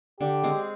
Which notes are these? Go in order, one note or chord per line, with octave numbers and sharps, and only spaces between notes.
D3 G4
G#3 C4